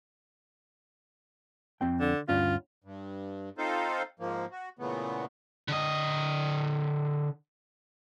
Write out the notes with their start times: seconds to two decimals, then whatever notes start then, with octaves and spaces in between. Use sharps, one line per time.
1.81 F2 C4 G5
2.00 D3
2.29 D2 G2 C#4 F4
2.84 G2
3.58 C4 D#4 F4 A4 C5 F5
4.20 G#2 F3 A#3
4.51 F#4
4.79 A#2 C#3 E3 A3 B3
5.68 D3 D#5